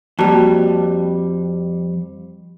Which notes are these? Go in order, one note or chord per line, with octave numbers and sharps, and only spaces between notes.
F2 G3 A#3 F#4 A5